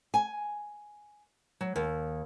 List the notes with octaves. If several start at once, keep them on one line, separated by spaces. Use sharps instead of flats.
G#5
F#3
D#2